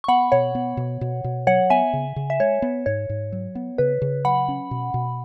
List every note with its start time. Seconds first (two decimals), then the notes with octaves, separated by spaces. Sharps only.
0.04 C#6
0.08 B3 F#5 B5
0.32 B2 C#5 F#5
0.55 B3
0.77 B2
1.01 B2
1.24 B2
1.47 F#3 C#5 F#5
1.70 B3 E5 G#5
1.93 C#3
2.16 C#3
2.30 E5
2.40 G#3 C#5
2.62 B3
2.86 G#2 C#5
3.09 G#2
3.32 F#3
3.55 B3
3.78 C#3 B4
4.02 C#3
4.25 F#3 F#5 B5
4.48 C#4
4.71 B2
4.94 B2